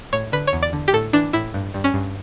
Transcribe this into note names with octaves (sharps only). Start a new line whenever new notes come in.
A2 C#5
D3 B4
C#5
E2
D5
D3
G4
A2 A4
E3 D4
A2 E4
G2
G2
C#4
G2